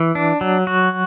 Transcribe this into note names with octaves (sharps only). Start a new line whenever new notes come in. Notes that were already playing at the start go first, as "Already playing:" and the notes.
Already playing: E3
D4
F#3
F#4